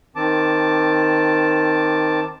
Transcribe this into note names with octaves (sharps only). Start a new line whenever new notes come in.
D#3 C4 A5 D6